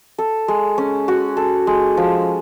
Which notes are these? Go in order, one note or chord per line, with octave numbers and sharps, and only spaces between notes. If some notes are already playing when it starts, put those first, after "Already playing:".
A4
G#3
C#4
F#4
A4
G#3
F3